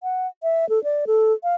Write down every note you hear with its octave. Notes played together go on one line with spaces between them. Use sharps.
F#5
E5
A4
D5
A4
F5